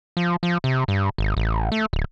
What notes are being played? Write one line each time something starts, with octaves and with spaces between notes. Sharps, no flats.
F3
F3
C3
G2
G#1
A1
A3
D1